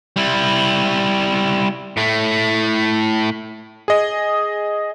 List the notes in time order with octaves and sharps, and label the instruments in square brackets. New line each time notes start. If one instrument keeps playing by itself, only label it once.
[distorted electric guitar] G3 E4
[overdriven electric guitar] A2 A3
[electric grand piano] G#4 D#5